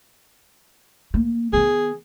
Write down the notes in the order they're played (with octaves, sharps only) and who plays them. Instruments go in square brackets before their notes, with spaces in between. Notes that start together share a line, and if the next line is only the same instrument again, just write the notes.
[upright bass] A#3
[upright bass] D#3 B3 [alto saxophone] G#4